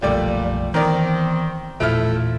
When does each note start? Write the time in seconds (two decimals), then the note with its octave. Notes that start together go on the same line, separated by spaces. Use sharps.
0.02 F#1 B1 A#2 F3 G3 A3 D5
0.74 D#3 E3 B3 C4 A#4 D5
1.80 A1 E2 A#2 F3 A3 E4 F6